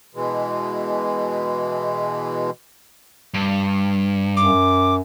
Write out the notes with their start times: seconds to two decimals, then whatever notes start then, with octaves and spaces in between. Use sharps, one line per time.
0.15 B2 E3 G#3
3.34 G2
4.37 F#2 D6